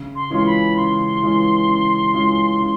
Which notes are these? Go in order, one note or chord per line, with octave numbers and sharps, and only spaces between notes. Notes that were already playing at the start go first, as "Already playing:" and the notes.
Already playing: C#3
C6
E3 G#3 C#4 F4 C6
B5
C#3 C6
E3 G#3 C#4 F4
C#3
E3 G#3 C#4 F4
C#3